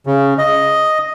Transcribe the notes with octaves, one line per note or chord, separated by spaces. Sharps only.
C#3
D#5